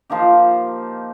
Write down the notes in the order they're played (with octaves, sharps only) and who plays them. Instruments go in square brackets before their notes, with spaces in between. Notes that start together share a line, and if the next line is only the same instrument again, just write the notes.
[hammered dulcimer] F3 A#3 D#4 G4